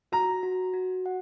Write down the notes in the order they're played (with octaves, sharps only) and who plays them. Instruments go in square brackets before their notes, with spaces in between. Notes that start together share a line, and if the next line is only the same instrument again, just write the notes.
[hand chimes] F#4 [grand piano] A#5
[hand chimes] F#4
F#4
F#5